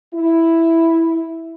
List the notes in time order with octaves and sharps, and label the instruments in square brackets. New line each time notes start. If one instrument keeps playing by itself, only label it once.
[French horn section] E4